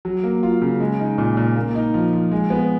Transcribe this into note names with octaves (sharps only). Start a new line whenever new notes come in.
F#3
A#3
F4
C#3
G#3
D#4
A#2
A#2
A#3
D#4
F3
F3
G#3
B3